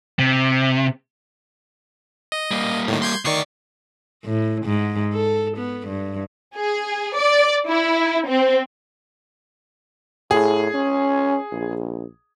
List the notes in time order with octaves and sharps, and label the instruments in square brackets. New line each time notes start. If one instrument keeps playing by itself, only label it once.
[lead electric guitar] C3
[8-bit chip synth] D#5
[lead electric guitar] G3 A#3
[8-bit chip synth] A2 D#3
C6 G6 G#6
[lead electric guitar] D2 D5 [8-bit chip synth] D#3 C#6 C7
[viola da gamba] A2
G#2
A4
B3
G2
[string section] G#4
D5
E4
C4
[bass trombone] A2 [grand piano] G#4
[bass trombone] C#4
A#1